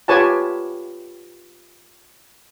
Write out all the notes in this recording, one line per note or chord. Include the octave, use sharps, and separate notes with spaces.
F4 G4 B4 C#5 G#5 A5